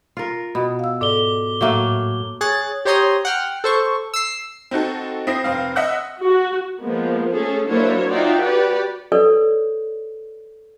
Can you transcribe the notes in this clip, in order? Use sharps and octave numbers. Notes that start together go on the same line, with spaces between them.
F4 A#4
B2 B5
F5 E6
G#2 A4 D5 D6 G7
A2 F#3 A3 A#3
G#4 C#5 F#6 A6
G4 C5 C#5 A#5 C6 D#6
F#5 G5 F6
A4 C5 C#6
E6 C7
C4 D#4 F#4 A4
C4 E4 D#6 A#6 C7
F1 C4 F5
D#5 E5 F#5 E6 F#6
F#4
F3 G#3 A#3 B3
A3 C#4 G#4 A4
F#3 A#3 D4 E4 C5 C#5
D#4 F4 D5 E5 F#5 G5
F#4 G4 B4 D5
A4 B4 C#5 D5